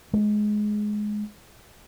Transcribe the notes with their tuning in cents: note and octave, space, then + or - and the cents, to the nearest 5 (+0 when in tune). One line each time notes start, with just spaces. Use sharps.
G#3 +15